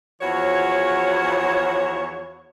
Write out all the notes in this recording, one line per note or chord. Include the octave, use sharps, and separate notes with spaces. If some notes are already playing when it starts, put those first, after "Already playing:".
E2 F3 F#4 C#5